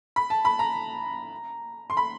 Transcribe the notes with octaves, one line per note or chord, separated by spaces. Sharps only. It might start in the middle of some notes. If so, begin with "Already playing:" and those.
B5
A5
B5
A#5
C6
B5